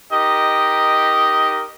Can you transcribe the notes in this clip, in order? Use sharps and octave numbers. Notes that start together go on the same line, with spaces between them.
D#4 G4 A#4 D#5